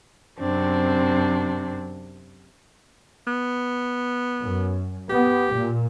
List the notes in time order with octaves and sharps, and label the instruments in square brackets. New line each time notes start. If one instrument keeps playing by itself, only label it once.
[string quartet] F#2 C3 C4 D4
[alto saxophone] B3
[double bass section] F#2
[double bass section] B3 [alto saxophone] G4
[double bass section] A#2